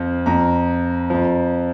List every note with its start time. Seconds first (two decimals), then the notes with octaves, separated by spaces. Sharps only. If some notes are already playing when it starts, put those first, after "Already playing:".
Already playing: F2 F3
0.26 F2 F3 A#5
1.10 F2 F3